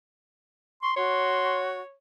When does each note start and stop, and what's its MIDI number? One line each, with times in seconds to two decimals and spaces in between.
0.82 0.93 84
0.82 0.91 85
0.97 1.81 66
0.97 1.94 73
0.97 1.62 84